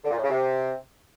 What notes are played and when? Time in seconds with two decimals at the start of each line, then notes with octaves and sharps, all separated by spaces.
0.04 D3
0.10 A#2
0.17 A2
0.24 C#3
0.30 C3